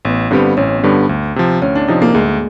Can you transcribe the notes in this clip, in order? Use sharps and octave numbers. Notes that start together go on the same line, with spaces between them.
A1 B3
G2 D3 G3 B3 C4
A1 C#4
G2 D3 G3 B3
D2
C3 F3
D2 C#4
D4
C3 F3 D#4
A#3
D2 G#3